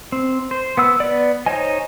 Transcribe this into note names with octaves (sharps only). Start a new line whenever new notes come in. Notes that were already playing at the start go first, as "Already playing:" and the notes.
C4
C5
B3 F#5 E6
B3 D5
D#4 C5 C#5 D#5 G#5